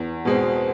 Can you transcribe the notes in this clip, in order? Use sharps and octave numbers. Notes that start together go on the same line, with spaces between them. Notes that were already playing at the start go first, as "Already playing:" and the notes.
Already playing: E2
B2 G#3 C4